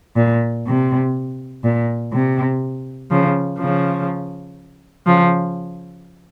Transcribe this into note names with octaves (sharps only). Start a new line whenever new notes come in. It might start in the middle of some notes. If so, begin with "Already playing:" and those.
A#2
C3
A#2
C3
C#3 F3
C#3 F3
C#3 F3